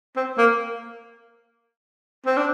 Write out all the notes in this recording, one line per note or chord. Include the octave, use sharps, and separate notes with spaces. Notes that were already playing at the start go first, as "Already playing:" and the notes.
C4
A#3
C4
D4